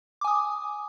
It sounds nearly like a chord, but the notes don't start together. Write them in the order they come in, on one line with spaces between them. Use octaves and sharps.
D6 G#5 D#6